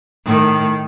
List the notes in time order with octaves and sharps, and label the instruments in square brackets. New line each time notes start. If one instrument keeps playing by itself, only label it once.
[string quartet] A2 D#3